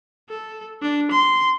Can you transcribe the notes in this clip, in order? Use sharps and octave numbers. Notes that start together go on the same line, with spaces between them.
A4
D4
C6